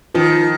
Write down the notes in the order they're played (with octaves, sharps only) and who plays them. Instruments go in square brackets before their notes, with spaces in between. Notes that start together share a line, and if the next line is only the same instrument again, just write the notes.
[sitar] D#3 [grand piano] F3